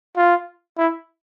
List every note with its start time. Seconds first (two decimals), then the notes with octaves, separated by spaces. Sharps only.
0.16 F4
0.78 E4